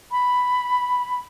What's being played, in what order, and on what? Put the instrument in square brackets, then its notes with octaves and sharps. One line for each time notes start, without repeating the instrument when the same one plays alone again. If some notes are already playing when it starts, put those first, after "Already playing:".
[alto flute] B5